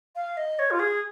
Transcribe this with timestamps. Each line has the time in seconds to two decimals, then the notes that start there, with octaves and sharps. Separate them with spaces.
0.16 F5
0.37 D#5
0.59 C#5
0.71 F4
0.79 G#4